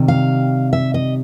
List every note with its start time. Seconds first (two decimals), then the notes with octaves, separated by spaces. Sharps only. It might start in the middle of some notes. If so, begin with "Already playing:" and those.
Already playing: C3 D#3 G3
0.08 F5
0.73 E5
0.94 D#5